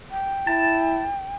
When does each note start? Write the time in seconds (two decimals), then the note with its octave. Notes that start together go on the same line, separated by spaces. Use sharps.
0.11 G5
0.47 E4 A5